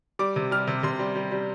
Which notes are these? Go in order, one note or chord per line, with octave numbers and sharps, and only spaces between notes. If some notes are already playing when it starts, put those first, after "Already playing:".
G3 D6
C3
G3 F6
C3
C3 C6
G3
G3
G3